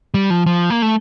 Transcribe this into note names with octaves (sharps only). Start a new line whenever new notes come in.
G3
F3
F3
A#3
A3